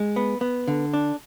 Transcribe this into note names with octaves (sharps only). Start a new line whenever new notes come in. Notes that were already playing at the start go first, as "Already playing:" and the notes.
Already playing: G#3
B3
B3
D3
D4